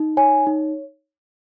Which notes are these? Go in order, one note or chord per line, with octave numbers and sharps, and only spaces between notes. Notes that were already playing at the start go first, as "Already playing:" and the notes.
Already playing: D#4
C#5 G#5
D#4